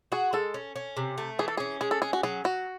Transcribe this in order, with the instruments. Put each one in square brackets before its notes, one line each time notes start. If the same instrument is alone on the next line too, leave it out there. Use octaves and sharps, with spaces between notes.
[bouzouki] F#4 [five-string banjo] G#4
[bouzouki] G#3 [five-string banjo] A4
[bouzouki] C#4
C#4
C3
A3
[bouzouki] E3 [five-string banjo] G#4
[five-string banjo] A4
[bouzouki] C#4 [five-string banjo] G#4
[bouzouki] G#3 [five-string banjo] G#4
[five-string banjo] A4
[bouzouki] C#4 [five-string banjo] G#4
[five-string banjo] F#4
[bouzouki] F#3 [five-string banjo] G#4
[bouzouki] F#3 [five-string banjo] F#4